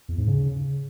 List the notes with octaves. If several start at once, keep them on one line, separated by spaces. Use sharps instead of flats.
E2
G#2
C#3